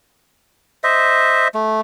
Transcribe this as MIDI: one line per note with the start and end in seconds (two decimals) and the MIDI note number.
0.84 1.48 72
0.84 1.48 75
0.84 1.48 76
1.54 1.81 57